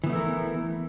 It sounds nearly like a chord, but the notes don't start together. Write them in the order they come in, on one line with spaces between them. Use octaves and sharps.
E3 B3 A3 E4 A#4